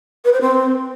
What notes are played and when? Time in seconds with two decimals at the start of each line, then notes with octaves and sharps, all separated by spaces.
0.25 B4
0.33 C5
0.41 C4